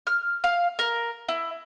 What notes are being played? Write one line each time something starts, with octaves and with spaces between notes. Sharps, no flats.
F6
F5
A#4
E4